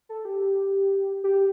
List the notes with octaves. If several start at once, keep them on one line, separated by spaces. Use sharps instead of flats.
A4
G4
G4